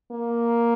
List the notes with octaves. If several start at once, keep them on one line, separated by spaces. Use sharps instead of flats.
A#3